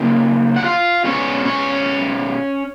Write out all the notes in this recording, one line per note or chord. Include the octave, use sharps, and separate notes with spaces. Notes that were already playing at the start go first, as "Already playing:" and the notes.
Already playing: C#3 F#3 A#3 D#4
F#5
F4 F5
B2 G#3 B3 C#4 C#5
C#4 C#5